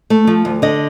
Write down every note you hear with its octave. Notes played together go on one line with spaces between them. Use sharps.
A3
F3
D2
D3 D#5